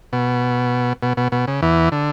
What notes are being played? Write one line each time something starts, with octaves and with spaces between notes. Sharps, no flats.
B2
B2
B2
B2
C#3
E2 E3
D3